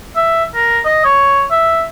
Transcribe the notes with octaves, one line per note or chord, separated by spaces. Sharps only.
E5
A#4
D#5
C#5
E5